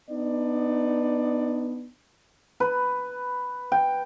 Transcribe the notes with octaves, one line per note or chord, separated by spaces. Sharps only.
B3 D4 D#4 D5
B4
G5